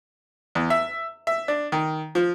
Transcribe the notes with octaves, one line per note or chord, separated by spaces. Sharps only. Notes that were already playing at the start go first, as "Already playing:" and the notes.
E2
E5
E5
D4
D#3
F3